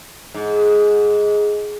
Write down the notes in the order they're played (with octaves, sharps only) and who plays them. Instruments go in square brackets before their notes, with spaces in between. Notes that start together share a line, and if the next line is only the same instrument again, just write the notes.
[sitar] G#2